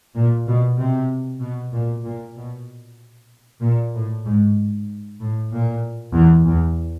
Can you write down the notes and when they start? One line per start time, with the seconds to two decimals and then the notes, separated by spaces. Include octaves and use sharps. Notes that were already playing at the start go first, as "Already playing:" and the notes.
0.15 A#2
0.47 B2
0.78 C3
1.41 B2
1.73 A#2
2.04 A#2
2.36 B2
3.62 A#2
3.93 A2
4.24 G#2
5.19 A2
5.51 A#2
6.13 E2
6.45 E2